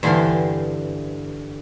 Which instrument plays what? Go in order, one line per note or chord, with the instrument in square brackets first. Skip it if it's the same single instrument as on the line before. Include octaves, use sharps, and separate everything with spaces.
[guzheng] G2 D3 E3 F5 G5 C6